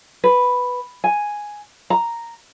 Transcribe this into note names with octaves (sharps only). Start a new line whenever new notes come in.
B4
G#5
A#5